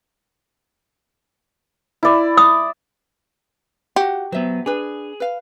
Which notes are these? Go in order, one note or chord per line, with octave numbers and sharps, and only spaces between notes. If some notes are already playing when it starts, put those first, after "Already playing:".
E4 D5
D#6
F#4 G4 F#5
F#3 B3 C5 E5
D4 G#4 B4
B4 F5